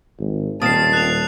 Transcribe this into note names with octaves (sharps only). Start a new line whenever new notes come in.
G#1
D#1 A#2 A#3 C4 A5 D#6 C7
F#6 F7